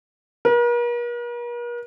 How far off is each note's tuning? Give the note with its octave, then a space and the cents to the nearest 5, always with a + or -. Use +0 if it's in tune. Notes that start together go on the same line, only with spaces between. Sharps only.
A#4 +45